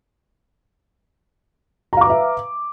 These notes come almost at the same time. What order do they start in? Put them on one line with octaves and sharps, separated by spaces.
A#5 F5 D6 B4 E5